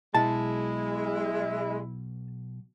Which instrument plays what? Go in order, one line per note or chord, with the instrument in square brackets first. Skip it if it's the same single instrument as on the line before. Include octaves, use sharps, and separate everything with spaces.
[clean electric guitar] B1 B2 [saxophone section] G#3 [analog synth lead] E4 [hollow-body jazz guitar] A5